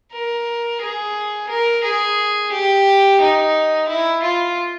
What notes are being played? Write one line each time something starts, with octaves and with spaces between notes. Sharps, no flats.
A#4
G#4
A#4
G#4
G4
D#4
E4
F4